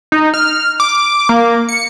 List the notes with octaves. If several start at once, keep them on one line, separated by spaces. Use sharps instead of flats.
D#4
F6
D6
A#3
C#7